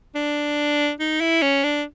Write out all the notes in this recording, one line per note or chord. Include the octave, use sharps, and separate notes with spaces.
D4
D#4
E4
C#4
D4